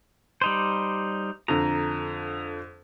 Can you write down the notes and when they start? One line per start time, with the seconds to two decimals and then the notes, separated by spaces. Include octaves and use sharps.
0.42 G3 D#4 C5
1.48 F2 D3 A#5